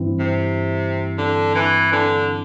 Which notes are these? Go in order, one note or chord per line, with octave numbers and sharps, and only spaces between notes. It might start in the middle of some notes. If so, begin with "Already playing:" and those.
Already playing: G2 E3 C4 E4
C3
D3
E3
D3